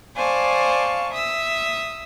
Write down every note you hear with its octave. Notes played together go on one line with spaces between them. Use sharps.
C5 D5 F5 G#5 A5 C#6
E5 D#6 E6